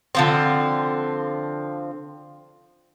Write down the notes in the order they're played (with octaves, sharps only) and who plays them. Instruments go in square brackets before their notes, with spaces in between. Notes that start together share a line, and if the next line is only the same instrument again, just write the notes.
[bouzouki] D3 F3 C4